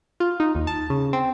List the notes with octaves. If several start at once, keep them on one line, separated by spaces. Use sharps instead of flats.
F4
D#4
D#2
A5
C#3
C4